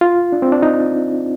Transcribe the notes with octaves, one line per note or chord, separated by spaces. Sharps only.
F4
D4
C4
D4
D#4